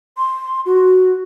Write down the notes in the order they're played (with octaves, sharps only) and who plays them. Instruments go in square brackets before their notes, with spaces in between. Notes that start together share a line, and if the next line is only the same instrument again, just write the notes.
[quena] C6
F#4